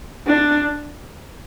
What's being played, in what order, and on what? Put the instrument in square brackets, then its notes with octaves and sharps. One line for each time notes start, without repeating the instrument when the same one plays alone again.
[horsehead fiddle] D4